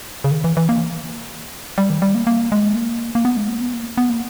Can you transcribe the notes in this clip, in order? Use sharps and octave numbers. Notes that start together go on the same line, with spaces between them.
C#3
D#3
E3
E3
A#3
G3
D#3
E3
G3
A#3
A#3
G#3
A#3
A#3
B3
G#3
A#3
B3
A#3
B3
A#3